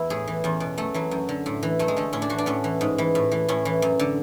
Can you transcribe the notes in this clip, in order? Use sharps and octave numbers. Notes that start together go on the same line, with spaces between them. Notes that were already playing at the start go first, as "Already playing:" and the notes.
Already playing: E2 E3 E4
A2 G#4
E3
E2 C#4
B2
F#2 A3
E3 F#3
F#2
D3
A2
E3
F#2 A3
G#3
D3 A3
A2 C#4
D4
E3 F#4
D4
A2 C#4
E3
G#2
E3
A2
E3
A2 C#4
E3
F#2
D3